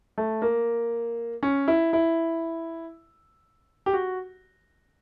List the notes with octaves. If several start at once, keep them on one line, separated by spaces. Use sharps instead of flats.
A3
A#3
C#4
E4
E4
G4
F#4